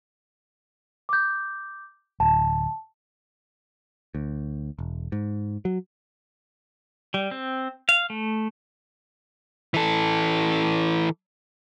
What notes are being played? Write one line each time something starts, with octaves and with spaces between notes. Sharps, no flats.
D6 G6
D1 A5
D2
E1
G#2
F#3
G3
C4
F5
A3
E3 A4